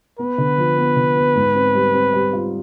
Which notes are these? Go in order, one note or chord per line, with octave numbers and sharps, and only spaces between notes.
B3 B4
D3
F3
B3
D3
B3
G#2
C4
G3
C4
G3
F4